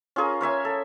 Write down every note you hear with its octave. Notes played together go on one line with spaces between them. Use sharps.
C#4 F4 G#4 A#4
A#4 C#5 E5 G#5
A4